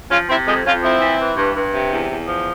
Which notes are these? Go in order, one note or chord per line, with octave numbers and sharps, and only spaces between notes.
F3 C#4 F4
C3 C4 E4
F2 F3 G#3
F2 C#4 F4
F3 C4 E4
E3
E3
G2
G2
C3
E2
E2
F3